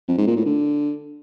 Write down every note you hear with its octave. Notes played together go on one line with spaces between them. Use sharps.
F2
G#2
A#2
A2
D3